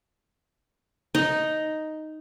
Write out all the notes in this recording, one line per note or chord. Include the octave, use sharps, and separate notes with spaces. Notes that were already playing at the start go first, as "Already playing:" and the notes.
D#4